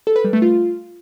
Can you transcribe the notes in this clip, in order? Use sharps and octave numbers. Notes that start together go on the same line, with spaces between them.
A4
B4
G3
A3
F4